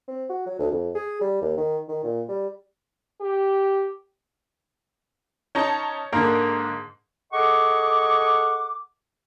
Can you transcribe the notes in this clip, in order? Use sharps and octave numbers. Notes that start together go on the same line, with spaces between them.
C4
F#4
F#3
D2
F2
G#4
G3
D#2
D#3
D#3
A#2
G3
G4
C#4 D#4 A5
G#2 D3 A#3 A#4
G#4 A4 D#5 F#5 C#6 D6